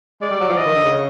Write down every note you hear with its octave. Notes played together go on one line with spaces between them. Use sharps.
G#3 D5
G3
F#3
F3
E3 D#5
D#3
D3
C#3